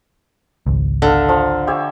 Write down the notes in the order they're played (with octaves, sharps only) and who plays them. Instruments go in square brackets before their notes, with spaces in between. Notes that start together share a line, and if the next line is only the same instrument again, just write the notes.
[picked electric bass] G#1 C#2
[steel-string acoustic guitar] D3 [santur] A4 E5 F5
[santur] F3 F5 A#5
G4 C#5 E5